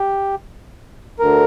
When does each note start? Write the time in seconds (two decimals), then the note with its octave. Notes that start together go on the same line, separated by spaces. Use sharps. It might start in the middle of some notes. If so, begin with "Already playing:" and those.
Already playing: G4
1.19 D2 D3 A#4